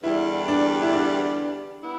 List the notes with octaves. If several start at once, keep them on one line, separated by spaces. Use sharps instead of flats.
E2 D3 G3 B3 E4
D4
E4
D4
B3 E4